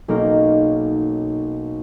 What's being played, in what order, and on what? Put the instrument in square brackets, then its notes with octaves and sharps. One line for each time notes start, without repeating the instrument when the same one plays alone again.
[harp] B1 A#3 C#4 D#4 F6